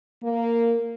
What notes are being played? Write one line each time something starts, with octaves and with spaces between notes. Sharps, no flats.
A#3